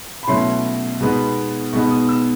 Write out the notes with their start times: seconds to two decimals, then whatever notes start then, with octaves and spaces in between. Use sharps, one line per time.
0.23 B5
0.28 B2 F#3 A3 C#4 E4 C6
1.01 B2 G#3 B3 D#4
1.73 B2 G#3 B3 D#4 C#6
1.91 D#6
2.09 E6